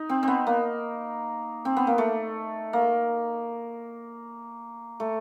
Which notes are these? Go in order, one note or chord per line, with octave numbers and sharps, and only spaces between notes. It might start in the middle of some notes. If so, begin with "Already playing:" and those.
Already playing: D#4
C4
B3 C4
A#3
C4
B3
A#3
A3
A#3
A3